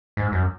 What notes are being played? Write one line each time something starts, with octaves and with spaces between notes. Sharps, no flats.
G#2
F#2